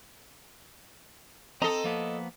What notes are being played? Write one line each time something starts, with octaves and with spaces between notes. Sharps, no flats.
C4 A4 D#5 A#5
F3 A#3 B3